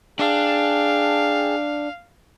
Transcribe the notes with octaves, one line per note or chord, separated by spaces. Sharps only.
D4 G#4 F5 G5 A5